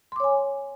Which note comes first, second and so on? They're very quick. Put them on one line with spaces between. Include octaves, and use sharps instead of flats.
C6 D6 C#5 G#5